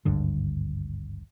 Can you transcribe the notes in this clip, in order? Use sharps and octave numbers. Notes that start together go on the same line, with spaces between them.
G#1 D2 G2 D3